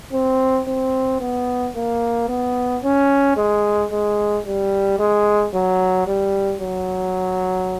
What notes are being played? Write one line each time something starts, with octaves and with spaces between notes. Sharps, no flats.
C4
C4
B3
A#3
B3
C#4
G#3
G#3
G3
G#3
F#3
G3
F#3